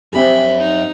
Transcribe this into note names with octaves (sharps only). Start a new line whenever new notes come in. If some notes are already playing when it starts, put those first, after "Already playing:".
F#2 C4 G4 G#4 E5 B5
D#4